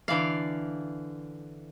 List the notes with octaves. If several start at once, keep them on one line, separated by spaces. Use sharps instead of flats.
D3 E3 D5 F5